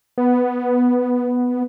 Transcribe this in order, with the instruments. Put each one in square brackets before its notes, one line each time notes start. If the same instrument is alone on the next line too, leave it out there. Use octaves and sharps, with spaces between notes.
[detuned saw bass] B3